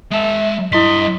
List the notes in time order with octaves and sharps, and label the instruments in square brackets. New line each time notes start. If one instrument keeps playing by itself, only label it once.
[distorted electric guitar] G#3 A5 [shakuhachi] E5
[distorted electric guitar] G2 C6 [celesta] E4 B6 [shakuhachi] D#5